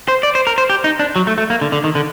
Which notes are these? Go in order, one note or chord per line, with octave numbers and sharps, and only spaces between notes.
C5
D5
C5
A#4
C5
G4
D#4
D4
F#3
A3
A3
A#3
D3
D3
D#3
D3